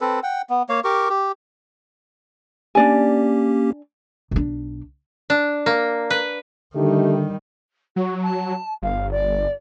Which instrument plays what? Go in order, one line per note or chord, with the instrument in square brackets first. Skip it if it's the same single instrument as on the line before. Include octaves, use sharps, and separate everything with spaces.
[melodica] C4 A4 B4
F#5 G5
B3
A#3 C#5 F5
G4 A#4 C#6 D6
G4
[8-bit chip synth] A#3 C#4 G4 [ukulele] D4 D5 G#5
[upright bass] B1 D4
[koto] D4
A#3
B4
[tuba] D3 [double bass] D#3 G3 [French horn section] A3 D#4 G4
[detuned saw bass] F#3 [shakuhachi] F#4
[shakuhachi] A5
[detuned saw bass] G1 [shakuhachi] F5
[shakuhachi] D5